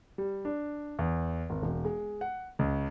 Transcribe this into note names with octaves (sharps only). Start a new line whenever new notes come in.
G3
D4
E2
G#1
E1
G#3
F#5
C#2